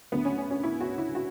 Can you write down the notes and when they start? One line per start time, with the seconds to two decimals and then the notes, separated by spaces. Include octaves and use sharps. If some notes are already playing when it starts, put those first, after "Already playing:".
0.12 D2 D3 F#3 B3
0.25 C#4
0.38 C#4
0.50 C#4
0.63 E4
0.81 F#4
0.98 E4
1.15 F#4